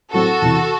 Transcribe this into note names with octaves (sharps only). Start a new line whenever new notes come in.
A2 F#3 C4 E4 F#4 A4
E2 C3 E3